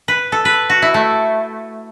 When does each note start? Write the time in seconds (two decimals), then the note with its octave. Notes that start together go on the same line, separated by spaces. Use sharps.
0.08 B4
0.32 A4
0.45 B4
0.70 F#4
0.82 E4
0.94 A3